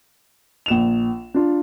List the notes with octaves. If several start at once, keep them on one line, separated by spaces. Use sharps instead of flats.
A#1 E7 F7
D4 F4